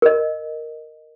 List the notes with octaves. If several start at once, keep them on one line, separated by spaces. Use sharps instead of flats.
A#4 D#5